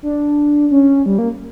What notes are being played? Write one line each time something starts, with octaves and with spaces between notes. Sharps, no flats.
D4
C#4
G3
A#3